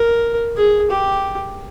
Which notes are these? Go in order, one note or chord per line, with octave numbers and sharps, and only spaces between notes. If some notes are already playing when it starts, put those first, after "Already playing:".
Already playing: A#4
G#4
G4